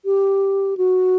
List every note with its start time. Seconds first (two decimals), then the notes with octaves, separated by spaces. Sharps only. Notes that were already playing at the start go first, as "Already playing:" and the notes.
0.05 G4
0.77 F#4